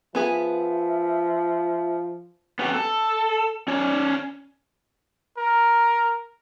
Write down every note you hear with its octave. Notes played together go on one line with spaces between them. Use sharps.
F3 B3 G#4 B4 E5
B3 C#4 G4
A4
C#4 C#5 D5
A#4